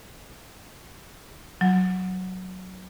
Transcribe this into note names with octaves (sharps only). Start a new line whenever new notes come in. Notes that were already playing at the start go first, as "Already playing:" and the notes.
F#3